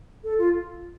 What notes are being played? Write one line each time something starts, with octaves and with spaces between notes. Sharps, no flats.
A4
F4